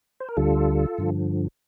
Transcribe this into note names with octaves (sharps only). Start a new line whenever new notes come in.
C5
A#4
D2 D3 G3 F4 A4
G2 D3 F3